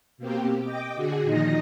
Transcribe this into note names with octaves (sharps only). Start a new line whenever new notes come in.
B2 A#3 C4 G4
D#5 G5 D6
D3 F#4 G#4
A#2 D#3 F3 D#4 D#5 A#6